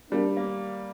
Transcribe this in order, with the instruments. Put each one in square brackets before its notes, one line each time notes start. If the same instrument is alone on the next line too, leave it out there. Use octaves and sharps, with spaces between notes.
[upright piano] G3 [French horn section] A#3 D4
[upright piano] A#3